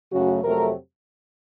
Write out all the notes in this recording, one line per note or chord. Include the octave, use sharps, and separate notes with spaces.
F#2 C#3 F#3 A3 F#4
F2 C3 F#3 A3 A#4